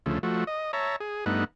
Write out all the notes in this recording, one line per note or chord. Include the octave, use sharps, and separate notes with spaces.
D2 C#3 F3 A3
F3 A3 F#4
D#5
C#5 E5 A5 A#5
G#4
G2 A3 B3 D#4 F#5